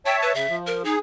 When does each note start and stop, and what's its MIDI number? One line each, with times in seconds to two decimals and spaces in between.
0.06 0.33 73
0.06 0.33 76
0.06 0.16 79
0.06 0.33 81
0.22 0.34 71
0.34 0.47 49
0.34 0.56 76
0.49 0.83 53
0.67 0.82 70
0.85 0.95 63
0.85 0.99 68